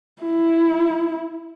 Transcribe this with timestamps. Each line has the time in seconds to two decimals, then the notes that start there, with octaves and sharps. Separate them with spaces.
0.22 E4